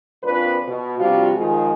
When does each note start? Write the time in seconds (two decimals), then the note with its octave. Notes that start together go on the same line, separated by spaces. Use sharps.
0.23 F2 A#2 F3 D4 B4
0.68 B2
1.00 C3 F3 G3 D4 F4 F#4
1.36 D#3 F3 G#3 F4 G#4